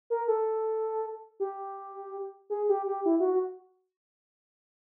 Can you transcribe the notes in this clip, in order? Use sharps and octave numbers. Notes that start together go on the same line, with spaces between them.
A#4
A4
G4
G#4
G4
G4
E4
F#4
F#4